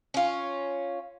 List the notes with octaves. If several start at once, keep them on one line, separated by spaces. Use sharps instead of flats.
C#4 F4